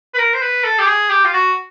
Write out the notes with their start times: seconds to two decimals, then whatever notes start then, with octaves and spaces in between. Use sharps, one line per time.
0.14 B4
0.18 A#4
0.34 C5
0.42 B4
0.64 A4
0.79 G4
0.87 G#4
1.10 G4
1.25 F4
1.33 F#4